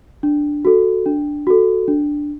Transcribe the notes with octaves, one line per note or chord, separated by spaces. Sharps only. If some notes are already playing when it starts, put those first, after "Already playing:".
D4
F#4 A4
D4
F#4 A4
D4